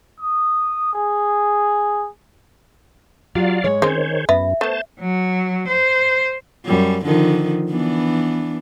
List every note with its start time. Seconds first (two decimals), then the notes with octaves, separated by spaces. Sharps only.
0.20 D#6
0.94 G#4
3.35 F#3 F4 G4 D5 F5
3.64 G#2 G#3 C#5
3.82 D#3 G#3 C4 C#4 G#4 C5 C#5
4.29 F#2 B3 B4 E5
4.61 A3 B3 C5 A5
5.00 F#3
5.68 C5
6.65 F#2 G3
7.05 D3 D#3 F3
7.70 E3 B3 D4